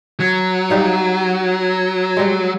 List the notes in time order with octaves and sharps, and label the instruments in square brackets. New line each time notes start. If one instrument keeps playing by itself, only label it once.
[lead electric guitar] F#3
[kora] G3 D#4 F5
G3 G#3